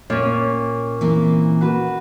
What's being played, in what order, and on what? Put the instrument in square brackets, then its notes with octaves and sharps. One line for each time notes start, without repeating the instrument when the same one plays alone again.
[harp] A#2 C#4 [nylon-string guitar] C#5
[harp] C#4
[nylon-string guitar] E3 A#3 C4
[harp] F#4 B4